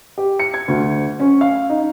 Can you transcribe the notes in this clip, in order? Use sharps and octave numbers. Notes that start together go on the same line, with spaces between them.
G4
C#7
G#6
D2
C#4
F5
D#4